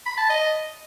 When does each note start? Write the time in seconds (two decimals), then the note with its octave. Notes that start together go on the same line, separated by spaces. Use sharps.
0.06 B5
0.17 A5
0.29 D#5